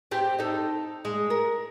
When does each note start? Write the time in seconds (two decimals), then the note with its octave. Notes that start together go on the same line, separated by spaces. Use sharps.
0.11 C4 G4
0.39 D#4 A4
1.05 G#3
1.30 A#4